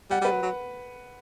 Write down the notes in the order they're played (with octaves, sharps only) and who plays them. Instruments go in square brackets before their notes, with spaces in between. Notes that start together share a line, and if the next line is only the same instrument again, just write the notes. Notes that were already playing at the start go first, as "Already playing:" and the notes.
[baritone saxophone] G3 [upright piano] F#5
[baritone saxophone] G3
[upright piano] B4
[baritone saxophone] F#3
F#3